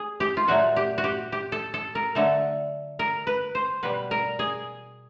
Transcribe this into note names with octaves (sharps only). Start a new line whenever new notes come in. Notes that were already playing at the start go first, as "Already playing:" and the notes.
Already playing: G#4
G4
F4
A#2 F#3 A3 F#4
G4
F#4
G4
G4
A4
A4
A#4
D3 F#3 A3 A4
A#4
B4
C5
B2 G3 B4
A#4
G#4